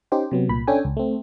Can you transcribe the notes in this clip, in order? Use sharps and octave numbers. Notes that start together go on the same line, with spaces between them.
C#4 D#4 G4 C5 G5
C3 F#3 B3
C2 A#2 B5
C#4 D4 A4 G5 G#5
C#2
A3 C4